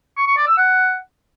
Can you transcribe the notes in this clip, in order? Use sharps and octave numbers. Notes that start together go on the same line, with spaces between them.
C#6
C#6
D5
E6
F#5